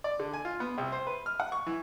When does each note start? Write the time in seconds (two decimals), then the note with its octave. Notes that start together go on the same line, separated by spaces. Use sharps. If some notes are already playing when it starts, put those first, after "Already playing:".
0.04 D5
0.20 D3
0.33 G#5
0.45 F4
0.60 B3
0.78 C2
0.92 C5
1.07 B4
1.26 F6
1.40 F#5
1.52 C#6
1.66 E3